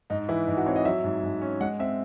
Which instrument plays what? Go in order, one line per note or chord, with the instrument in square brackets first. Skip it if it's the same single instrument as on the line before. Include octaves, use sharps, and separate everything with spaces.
[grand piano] G#2 D#4
E3 E4
G#2 D#4
F#4
C4 C#5
D#5
F#3 E5
G#2
G#2
C#4
G#3 F#5
C4 E5